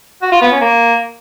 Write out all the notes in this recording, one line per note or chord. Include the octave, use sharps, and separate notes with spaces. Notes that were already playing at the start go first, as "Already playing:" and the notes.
F#4
F4
B3
C#4
A#3